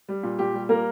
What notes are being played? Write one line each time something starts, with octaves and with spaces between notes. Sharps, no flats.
G3
A#2
A#2 G4
G3
A#2 A#3 A#4